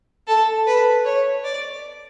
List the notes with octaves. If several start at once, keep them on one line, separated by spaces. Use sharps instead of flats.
A4
B4
C#5
D5